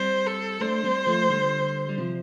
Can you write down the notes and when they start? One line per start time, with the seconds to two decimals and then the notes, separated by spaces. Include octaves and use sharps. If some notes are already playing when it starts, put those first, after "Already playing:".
Already playing: G3 C4 C5
0.27 A4
0.61 A3 D4 C5
0.84 G3 C4
1.07 F3 A3
1.30 D3 G3
1.89 G3
1.98 C3 F3